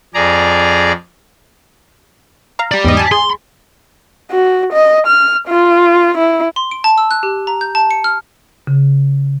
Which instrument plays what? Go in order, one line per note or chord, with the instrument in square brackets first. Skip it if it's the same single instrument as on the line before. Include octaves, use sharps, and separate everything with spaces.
[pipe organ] F2 G#4 D5 A#5
[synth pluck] F5 A#5
[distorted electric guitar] G4 D5
[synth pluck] E2 G#2 D#5
G#5 A5
[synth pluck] G#4 [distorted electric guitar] C6
[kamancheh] F#4
D#5
F6
F4
E4
[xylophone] C6
D7
A5
E6
F#6
G4
A#5
G6
A5
C#7
F6
[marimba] C#3